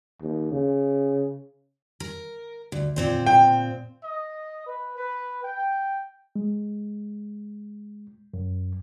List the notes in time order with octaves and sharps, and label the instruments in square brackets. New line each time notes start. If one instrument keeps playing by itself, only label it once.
[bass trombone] D#2
C#3
[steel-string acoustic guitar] A#4
D2
A#2 C4 C5
[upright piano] G5
[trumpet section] D#5
B4
B4
G5
[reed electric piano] G#3
F#2